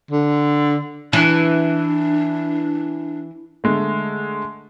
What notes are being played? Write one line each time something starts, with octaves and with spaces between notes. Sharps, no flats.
D3
E3 D4
D3 G#3 A3